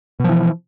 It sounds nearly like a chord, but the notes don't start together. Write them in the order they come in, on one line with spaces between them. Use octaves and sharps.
B2 F3 E3